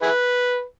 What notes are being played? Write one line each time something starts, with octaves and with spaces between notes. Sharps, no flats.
E4 G#4 B4